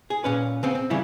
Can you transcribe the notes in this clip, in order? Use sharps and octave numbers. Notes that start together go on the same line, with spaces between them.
G#4
A#2 C#4 B4
C#3 B3 C4
C4
C#3 E3 G3 E4